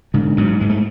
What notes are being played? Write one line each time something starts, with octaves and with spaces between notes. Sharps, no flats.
G#2 D3
G#2 F#3
G#2 G#3
A3